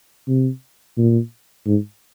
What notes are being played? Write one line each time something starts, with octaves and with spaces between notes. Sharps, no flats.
C3
A#2
G#2